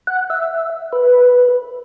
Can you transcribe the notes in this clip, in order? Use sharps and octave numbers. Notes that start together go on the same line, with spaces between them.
F#5
E5
B4